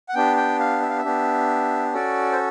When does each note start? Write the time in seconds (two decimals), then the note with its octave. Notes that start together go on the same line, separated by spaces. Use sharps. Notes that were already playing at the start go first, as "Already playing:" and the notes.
0.09 F#5
0.15 B3 D4 G4 G5
0.37 G5
0.59 F5
0.82 E5
0.89 F5
0.98 E5
1.04 B3 D4 G4
1.93 C#4 F#4 A4 D5
2.32 C5